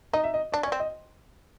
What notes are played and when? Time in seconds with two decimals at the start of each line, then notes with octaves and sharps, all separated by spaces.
0.13 D#4 D#5
0.24 E5
0.34 D#5
0.52 D4 D5
0.63 C#4 D5
0.72 C4
0.80 D#5